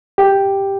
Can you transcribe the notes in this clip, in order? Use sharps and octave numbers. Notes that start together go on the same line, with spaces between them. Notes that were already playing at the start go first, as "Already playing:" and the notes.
G4